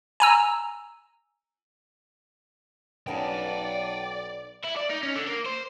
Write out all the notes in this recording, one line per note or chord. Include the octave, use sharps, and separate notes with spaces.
G#5 A#5 E6
B1 B3 C#4 D#4 D5 G5 A5
E4
D5
D#4
C#4
D3
A#3
C5